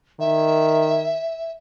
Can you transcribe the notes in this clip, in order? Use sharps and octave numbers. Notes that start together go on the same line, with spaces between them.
D#3 E5